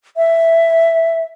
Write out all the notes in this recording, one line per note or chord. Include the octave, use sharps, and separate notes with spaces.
E5